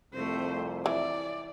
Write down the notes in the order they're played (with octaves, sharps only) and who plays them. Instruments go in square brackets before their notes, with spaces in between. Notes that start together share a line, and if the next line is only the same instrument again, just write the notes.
[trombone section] C2 F2 C3 [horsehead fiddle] A3 C5
[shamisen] E3 [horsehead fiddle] D5